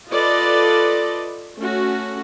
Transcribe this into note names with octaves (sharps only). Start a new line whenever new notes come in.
F4 A4 B4 D5 D#5
A3 C#4 F#4